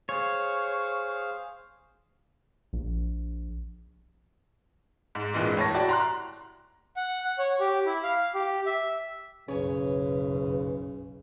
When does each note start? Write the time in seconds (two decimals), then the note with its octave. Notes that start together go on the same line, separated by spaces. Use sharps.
0.09 G#4 C5 C#5 F5
2.73 A#1
5.15 G#2
5.34 C2 G2 A#2 E3 G#3
5.57 A2 C#5 A5 A#6
5.74 E4 F#4 G4 D5 A5
5.89 A#5 C6 F#6
6.97 F#5
7.24 F#5
7.39 C#5
7.60 G4
7.86 E4
8.03 F5
8.34 G4
8.66 E5
9.48 F#1 B1 C#3 C#4 B4 C#5